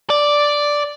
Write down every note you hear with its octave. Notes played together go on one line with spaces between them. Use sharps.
D5